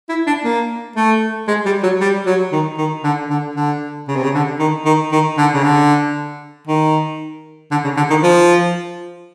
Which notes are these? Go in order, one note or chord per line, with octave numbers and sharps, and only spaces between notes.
E4
D4
A#3
A3
G#3
G3
F#3
G3
F#3
D#3
D#3
D3
D3
D3
C#3
C3
C#3
D3
D#3
D#3
D#3
D3
C#3
D3
D#3
D3
C#3
D3
D#3
F3